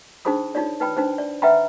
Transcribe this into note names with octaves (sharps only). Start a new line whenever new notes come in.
D4 D#4 G#4 C5 B5 D#6
D#4 F4 C#5 D5
D#4 B4 G5 B5
D4 D#4 C5
D5
B4 E5 F#5 G5 A#5 B5